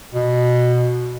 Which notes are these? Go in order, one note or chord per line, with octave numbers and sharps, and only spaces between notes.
B2